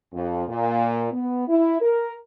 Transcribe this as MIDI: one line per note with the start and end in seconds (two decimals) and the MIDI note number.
0.13 0.44 41
0.48 1.07 46
1.12 1.48 59
1.48 1.80 64
1.81 2.14 70